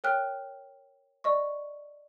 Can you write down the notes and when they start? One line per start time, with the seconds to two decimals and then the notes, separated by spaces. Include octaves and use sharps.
0.04 A#4 C#5 G5 F6 F#6
1.24 D5 D#5 C#6